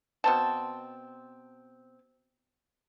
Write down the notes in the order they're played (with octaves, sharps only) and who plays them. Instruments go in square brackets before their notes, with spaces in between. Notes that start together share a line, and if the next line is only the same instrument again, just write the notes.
[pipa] B2 C4 A5